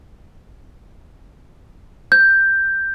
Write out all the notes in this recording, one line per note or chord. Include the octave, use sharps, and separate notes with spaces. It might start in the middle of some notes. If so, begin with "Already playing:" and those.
G6